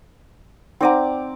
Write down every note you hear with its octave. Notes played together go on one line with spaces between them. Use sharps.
C4 D#4 C5 D5 F#5 A#5